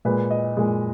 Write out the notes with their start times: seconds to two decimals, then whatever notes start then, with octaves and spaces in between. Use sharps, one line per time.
0.05 A#2 G#3 B4
0.31 D#5
0.57 A#2 G#3